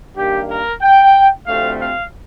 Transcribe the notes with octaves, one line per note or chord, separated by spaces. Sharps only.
G2 D#3 A#3 G4
A#4
G5
D2 C3 F3 A3 C4 F5
F5